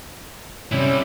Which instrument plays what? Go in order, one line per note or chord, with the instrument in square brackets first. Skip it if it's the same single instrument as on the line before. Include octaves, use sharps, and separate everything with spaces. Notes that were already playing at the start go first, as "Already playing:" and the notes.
[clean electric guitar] C3 [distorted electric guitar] G3 E4 [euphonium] C#4